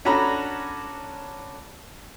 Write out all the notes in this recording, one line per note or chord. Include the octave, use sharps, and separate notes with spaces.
C#4 D4 F#4 A4 A#5 B5